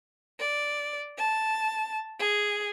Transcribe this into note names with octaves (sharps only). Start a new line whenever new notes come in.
D5
A5
G#4